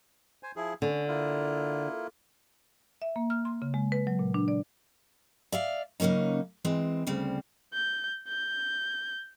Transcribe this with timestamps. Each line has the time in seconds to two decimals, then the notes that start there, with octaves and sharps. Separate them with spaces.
0.43 C5 G#5
0.56 F3 E4 G#4
0.82 D3 C#4
1.08 A#3 E4 F4
3.02 E5
3.16 A#3
3.30 F6
3.45 C6
3.62 C#3
3.74 G#3
3.92 B4
4.07 F#3
4.19 A#2
4.34 D4
4.48 D5
5.52 D5 E5 F5
6.00 C#3 F#3 A#3 C#4 D#4
6.64 E3 G#3 C4
7.07 D2 C#3 G3 C4
7.74 G6
8.29 G6